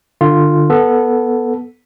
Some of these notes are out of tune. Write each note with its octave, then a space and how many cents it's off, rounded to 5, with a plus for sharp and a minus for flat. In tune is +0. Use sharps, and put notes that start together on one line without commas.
D3 +30 F4 +0
B3 -10 A4 +0